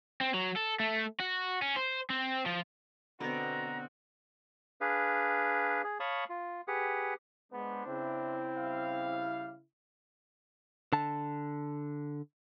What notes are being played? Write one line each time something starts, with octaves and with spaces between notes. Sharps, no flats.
C4
F#3
A4
A3
F#4
C#4
C5
C4
F3
B2 D3 B3 C4 F#4 B4 D5 A#5
D4 G#4 B4 F5
G#4
C#5 F5 A5 B5 C#6 D#6
F4
G4 G#4 B4 F#5
G#3 B3 D4 B4 C5
C#3 C4 E4
G3 F5
D3 A5